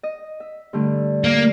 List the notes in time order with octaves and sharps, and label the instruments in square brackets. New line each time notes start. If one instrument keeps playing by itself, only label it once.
[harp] D#5
E5
G2 D3 A3
[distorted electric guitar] A#3